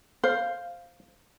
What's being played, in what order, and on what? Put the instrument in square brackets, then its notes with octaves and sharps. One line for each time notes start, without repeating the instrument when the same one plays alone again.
[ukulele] C5 [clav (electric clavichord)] F5